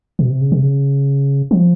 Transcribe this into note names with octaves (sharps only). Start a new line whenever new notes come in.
B2
C3
C#3
C3
C#3
F3